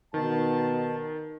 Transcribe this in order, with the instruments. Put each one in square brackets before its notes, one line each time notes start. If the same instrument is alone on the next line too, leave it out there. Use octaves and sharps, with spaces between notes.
[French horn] B2 [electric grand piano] D#3 [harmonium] A5